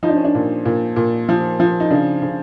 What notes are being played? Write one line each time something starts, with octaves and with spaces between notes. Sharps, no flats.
F3 D#4
D4
C#4
D4
A#2
A#2
A#2
F3
F3
D#4
C#3 D4
C#3